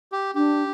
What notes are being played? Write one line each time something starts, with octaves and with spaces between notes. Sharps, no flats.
G4
D4 G4